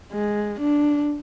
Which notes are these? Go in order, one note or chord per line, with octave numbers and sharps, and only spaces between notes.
G#3
D4